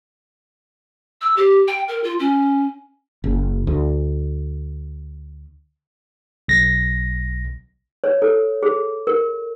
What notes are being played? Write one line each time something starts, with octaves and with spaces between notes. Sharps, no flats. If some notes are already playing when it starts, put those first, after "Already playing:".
E6
G4
G5
A#4
F4
C#4
F#1
D2
B1 A#6
C#5
A4
G#4
A#4